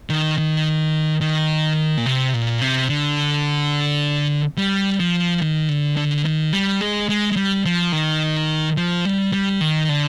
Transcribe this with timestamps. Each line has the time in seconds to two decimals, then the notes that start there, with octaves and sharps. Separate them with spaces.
0.10 D#3
0.38 D#3
1.21 D#3
1.98 A#2
2.06 C3
2.34 A#2
2.61 C3
2.89 D3
4.57 G3
5.00 F3
5.42 D#3
5.69 D3
5.97 D3
6.25 D#3
6.53 G3
6.81 G#3
7.09 G#3
7.32 G#3
7.36 G3
7.65 F3
7.92 D#3
8.77 F3
9.05 G3
9.33 G3
9.61 D#3
9.89 D3